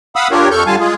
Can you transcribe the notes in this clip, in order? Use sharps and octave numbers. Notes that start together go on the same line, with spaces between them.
F5 F#5 B5 D#6 E6
D4 F4 G4 A#4 C#5
F2 A4 C#6 F6 G6
D3 G3 F4 F5 G#5 A5
G#3 F4 G#4